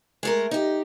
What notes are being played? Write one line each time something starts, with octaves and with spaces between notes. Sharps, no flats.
G#3 A3 A#4
D#4 G4